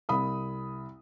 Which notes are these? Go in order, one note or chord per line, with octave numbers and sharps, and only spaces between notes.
C2 B5 D#6